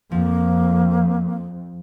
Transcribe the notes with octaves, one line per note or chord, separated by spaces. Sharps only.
F2 F3 A#3